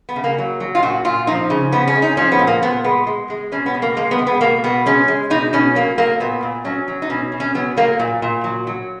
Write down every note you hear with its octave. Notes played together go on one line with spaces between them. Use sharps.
B3
C#3
A#3
F#3
F#3
F4
A#2 F#4
A#2 F4
F3 D#4
C#3
C#3 B3
C#4
G#3
D#4
F3 C#4
B3
A#2
A#3
A#2 B3
G#3 B3
G#3
G#3
B2 C#4
B3
B2
A#3
G#3 A#3
B3
G#3
B3
B2 A#3
B2 B3
G#3 C#4
G#3
B2 D#4
B2 C#4
F#3 A#3
F#3 A#3
A#2 B3
A#2
F#3 C#4
F#3
D#4
B2 C#4
B2
C#4
F#3 B3
F#3 A#3
A#2
A#2
F#3
F#3